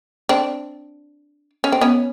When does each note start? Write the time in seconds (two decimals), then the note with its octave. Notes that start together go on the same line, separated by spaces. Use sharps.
0.29 C4 D4
1.64 C#4
1.72 C4
1.81 B3 C#4